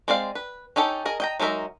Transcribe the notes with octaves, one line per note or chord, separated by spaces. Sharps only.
G#3 C4 D5 F5
B4
C#4 D#4 G4 A4
G#4 A#4 D#5
D#5 G5 A#5
F#3 G#3 D#4 A#4 E5